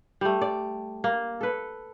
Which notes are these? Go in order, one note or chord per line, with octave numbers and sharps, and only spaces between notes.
G3 A3
D5
A#3
A4 B4